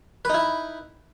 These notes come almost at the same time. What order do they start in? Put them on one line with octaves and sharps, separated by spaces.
B4 D#4 E4